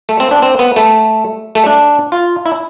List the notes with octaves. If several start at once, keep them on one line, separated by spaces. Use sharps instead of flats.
A3
C4
D4
C4
B3
A3
A3
D4
F4
E4